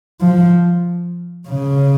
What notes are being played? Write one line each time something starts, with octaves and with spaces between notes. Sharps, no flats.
F3
C#3